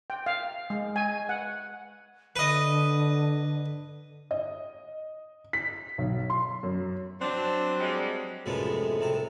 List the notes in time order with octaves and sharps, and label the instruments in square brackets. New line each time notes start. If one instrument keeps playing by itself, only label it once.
[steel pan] G5
F5
G#3
G#5
F#5
[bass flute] D3 [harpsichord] B4 D#5
[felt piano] D#5
B6
B1
C6
F#2
[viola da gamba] F#3 [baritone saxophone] C4 [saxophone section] D4
[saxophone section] G3 G#3
[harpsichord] F#2 A2 C3 F3 G#3 B3
C2 C3 A4